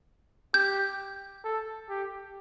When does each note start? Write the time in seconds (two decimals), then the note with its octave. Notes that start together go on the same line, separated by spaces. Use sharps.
0.54 G4 G6
1.44 A4
1.89 G4